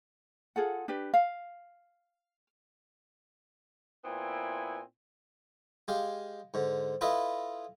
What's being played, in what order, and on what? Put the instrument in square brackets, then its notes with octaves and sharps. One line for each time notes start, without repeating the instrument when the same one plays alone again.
[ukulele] F4 G#4 A4 F#5
D4 G4 B4
F5
[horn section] A#2 B3 C4 E4 G#5
[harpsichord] G#3 G4 F5
G#2 D3
E4 F4 A4 B4 D#5 E5